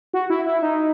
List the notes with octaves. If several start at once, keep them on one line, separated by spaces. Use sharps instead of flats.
F#4
E4
E4
D#4